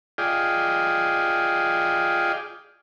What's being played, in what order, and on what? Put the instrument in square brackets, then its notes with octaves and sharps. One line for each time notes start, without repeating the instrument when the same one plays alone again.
[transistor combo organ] F4 G#4 D5 D#5 G5